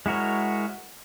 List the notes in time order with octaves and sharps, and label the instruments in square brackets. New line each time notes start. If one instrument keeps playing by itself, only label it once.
[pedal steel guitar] G#3 E4 F#4 A#4 C#5